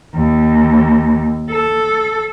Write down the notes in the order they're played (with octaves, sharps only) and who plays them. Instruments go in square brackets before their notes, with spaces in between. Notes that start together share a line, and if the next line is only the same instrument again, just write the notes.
[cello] D#2
A4